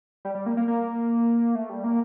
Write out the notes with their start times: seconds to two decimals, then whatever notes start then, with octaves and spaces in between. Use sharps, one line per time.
0.25 G3
0.35 G3
0.46 A#3
0.57 A#3
0.68 A#3
1.55 A3
1.70 G3
1.84 A#3